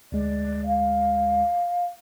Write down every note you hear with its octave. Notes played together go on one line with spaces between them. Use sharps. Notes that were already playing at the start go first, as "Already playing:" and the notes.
D2 G#3 D5
F5